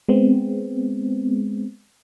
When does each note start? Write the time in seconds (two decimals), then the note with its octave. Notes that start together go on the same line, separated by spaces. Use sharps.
0.09 G#3 B3 C4